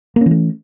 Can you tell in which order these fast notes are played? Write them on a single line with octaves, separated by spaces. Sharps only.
A#3 C#4 E3 A3